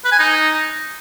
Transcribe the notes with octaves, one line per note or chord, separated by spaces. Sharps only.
B4
G#5
D#4